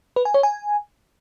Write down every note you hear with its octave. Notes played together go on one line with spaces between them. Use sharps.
B4
G#5
C#5
G#5